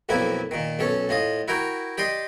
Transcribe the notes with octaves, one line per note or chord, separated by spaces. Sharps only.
B1 F2 A#3 E4 E5
A#2 D#3
B1 C#4 A4
A2 F4 D#5
E4 F#4 A#4 G5 A#5
G4 D5 D#5 C6